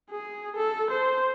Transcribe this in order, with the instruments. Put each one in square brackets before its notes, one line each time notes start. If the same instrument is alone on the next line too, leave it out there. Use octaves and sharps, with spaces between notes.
[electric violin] G#4
A4
C5